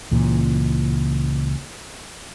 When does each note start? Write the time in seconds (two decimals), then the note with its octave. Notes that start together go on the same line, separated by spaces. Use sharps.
0.11 C#2 A#2 E3